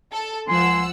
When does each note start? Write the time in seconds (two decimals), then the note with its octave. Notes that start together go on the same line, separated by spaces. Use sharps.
0.12 A4
0.48 C#2 F3 F#5 G#5 C6 E6